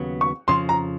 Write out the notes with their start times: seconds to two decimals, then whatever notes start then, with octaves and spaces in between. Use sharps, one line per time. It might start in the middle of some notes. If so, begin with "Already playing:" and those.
Already playing: D#2 C#3 F#3 B3
0.21 C#6
0.48 F2 C#3 F3 C6
0.69 A#5